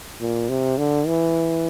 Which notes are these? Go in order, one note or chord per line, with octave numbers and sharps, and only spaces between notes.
A#2
C3
D3
E3